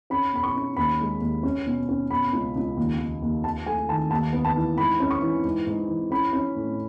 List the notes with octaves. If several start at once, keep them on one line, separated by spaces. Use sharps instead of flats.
C#4 B5
B2 B5
C#6
C#4
D#2 B5
G#3
D#2
C#4
B2
C#4
B2 B5
C#2
C#2
D#2
D#2
D#2
D#2 A5
A3 G#5
D#3 A5
D#2 A5
B3
A5
E3
G#2 B5
C#4
C#6
E3
G#2
G#2
E3
C#4 B5
C#4
A2